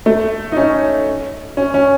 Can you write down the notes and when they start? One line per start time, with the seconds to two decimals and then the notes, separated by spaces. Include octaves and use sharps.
0.06 A3
0.52 D#4
0.57 C#4
1.57 C#4
1.74 C#4